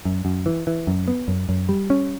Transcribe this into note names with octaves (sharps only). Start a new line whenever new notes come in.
F#2
F#2
E3
E3
F#2
B3
F#2
F#2
G3
C#4